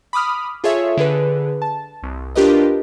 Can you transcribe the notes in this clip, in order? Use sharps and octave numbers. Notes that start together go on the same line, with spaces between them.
B5 D6 D#6 F6
F4 G#4 A4 C#5 E5
D3 G#4 B4
A5
C2
D4 F4 G4 A#4 B4 D#5